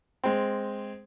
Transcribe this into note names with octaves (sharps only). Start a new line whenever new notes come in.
G#3 C4